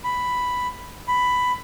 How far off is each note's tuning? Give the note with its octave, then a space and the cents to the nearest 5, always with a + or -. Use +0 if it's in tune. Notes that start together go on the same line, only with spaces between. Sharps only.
B5 +5
B5 +10